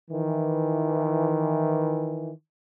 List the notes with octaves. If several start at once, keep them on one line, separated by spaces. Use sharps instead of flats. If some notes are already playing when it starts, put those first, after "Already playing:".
D#3 E3